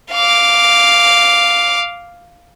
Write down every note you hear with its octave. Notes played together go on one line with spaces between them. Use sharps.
F5 D6